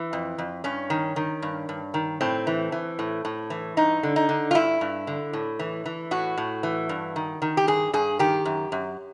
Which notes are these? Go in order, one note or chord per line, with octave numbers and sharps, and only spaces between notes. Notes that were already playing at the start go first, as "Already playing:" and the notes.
Already playing: E3
F2
F2
G2 C#4
D#3
D#3
G2
G2
D#3
A2 C4
E3
E3
A2
A2
E3
G2 D#4
D3
D#4
D3
F4
G2 E4
G2
D3
A2
E3
E3
A2 F#4
A2
E3
G2
D#3
D#3
G4
G2 G#4
G2 G#4
D#3 G4
F#2
F#2